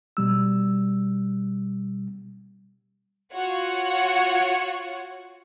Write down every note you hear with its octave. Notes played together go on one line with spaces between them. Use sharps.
B2 G3 E6
F4 F#4 C#5 F#5